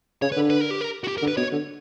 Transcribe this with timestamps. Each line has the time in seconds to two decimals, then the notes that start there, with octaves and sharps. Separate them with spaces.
0.22 C#3 C#5
0.32 B4
0.36 D3
0.50 B4
0.61 A#4
0.71 G4
0.81 A#4
1.04 F#4
1.08 G4
1.18 A#4
1.22 D3
1.28 B4
1.37 B2 C#5
1.52 D3